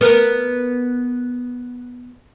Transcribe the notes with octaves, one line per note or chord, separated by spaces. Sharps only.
B3 A#4